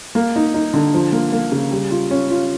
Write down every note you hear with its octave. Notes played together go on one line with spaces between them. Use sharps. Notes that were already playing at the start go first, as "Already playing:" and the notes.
A#3
D#4
D#4
D3
F3
A#3
A#3
C#3
G3
F4
C#4
F4